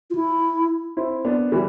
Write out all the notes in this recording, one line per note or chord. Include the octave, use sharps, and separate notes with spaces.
F4
E4
C4 E4
B3 D4
E3 G3